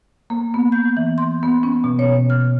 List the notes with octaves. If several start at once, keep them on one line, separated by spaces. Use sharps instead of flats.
A#3
B3
G6
E3
C6
B3
C#4
B2
C#5
F6